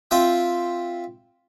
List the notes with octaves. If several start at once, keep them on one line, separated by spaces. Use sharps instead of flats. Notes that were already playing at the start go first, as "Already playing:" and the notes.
C4 F4 E5 G5